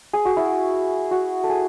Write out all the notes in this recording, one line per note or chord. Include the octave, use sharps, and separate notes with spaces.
G#4
F#4
E4
F#4
A4
G#4